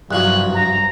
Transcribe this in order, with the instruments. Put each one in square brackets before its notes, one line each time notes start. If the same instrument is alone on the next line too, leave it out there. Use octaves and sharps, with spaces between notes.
[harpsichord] C2 F3 F#3 [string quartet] G2 [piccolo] F#6
[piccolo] A#5